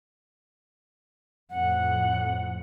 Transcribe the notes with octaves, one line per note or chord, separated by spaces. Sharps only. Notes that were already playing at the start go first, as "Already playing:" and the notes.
F2 A2 F#5